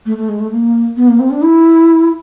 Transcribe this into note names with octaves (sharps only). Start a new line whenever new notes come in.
A3
A3
G#3
A3
A#3
B3
A#3
C4
D4
E4